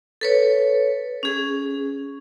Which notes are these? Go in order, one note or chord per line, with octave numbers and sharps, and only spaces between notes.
A4 B4 C#5
C#4 G#4